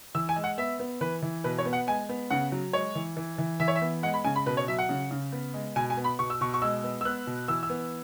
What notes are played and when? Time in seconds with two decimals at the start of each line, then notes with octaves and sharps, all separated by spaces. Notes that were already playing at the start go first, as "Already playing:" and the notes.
0.15 E3 E6
0.29 G#5
0.36 G#3
0.44 F#5
0.58 B3 E5
0.79 B3
1.01 E3 B4
1.22 E3
1.44 B2 B4
1.58 C#5
1.66 B3
1.73 F#5
1.87 G#3 G#5
2.09 B3
2.30 C#3 F#5
2.52 F#3
2.73 G#3 C#5
2.95 E3
3.17 E3
3.38 E3
3.60 E3 E5
3.68 C#5
3.76 E5
3.81 B3
4.03 G#3 F#5
4.14 B5
4.24 C#3 G#5
4.36 B5
4.46 B2 B4
4.57 C#5
4.68 F#3 E5
4.78 F#5
4.89 C#3
5.11 C#3
5.32 B3
5.54 G#3
5.76 B2 G#5
5.90 G#5
5.97 B3
6.04 B5
6.19 B2 C#6
6.30 E6
6.41 B2 C#6
6.54 C#6
6.62 G#3 E6
6.84 B3
7.01 E6
7.05 B3 F#6
7.27 B2
7.48 E3 E6
7.63 E6
7.70 B3